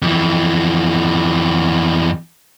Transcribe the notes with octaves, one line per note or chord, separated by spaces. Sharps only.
F2 E3